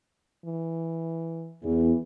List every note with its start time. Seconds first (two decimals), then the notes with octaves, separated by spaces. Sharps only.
0.45 E3
1.63 E2 E3